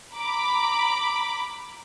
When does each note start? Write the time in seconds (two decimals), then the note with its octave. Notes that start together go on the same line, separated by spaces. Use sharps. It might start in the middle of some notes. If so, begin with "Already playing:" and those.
0.14 A#5 B5 D6